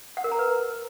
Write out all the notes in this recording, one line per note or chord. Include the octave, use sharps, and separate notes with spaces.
F#5
A#4
A#5
B4